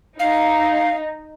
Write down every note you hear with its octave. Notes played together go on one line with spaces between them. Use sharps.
D#4 F5